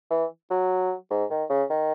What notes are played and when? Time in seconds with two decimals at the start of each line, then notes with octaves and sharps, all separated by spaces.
0.11 E3
0.51 F#3
1.11 G#2
1.30 D#3
1.50 C#3
1.70 D#3